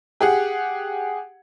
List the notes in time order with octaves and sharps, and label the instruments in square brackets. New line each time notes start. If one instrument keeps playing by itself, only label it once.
[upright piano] G4 G#4 F#5